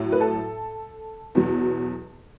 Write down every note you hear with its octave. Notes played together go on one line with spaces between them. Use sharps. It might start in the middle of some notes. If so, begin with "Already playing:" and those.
Already playing: A2 F#3
B4
A4
E2 B2 F#3